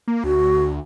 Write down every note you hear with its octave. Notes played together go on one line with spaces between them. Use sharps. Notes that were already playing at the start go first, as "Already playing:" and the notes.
A#3
D2 F#4